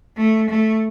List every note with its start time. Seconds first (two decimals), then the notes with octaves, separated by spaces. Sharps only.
0.17 A3
0.50 A3